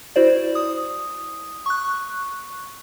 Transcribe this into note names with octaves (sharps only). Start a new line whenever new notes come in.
E4 F#4 C5 D5
D#6
C#6 F#6